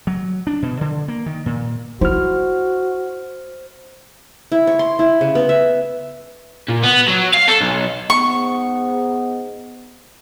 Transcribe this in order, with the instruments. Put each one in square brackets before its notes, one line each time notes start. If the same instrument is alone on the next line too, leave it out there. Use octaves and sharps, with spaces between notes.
[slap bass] F#3
D4
B2
D3
A#3
D#3
A#2
[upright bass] E4 [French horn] F#4 [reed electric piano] C5 F6
[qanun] E4
C#5
C6
E4
C#3
B3
E5
[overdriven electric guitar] A#2
B3
F#3
F5
A4
B1
[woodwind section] G#2 B3 [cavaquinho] C#6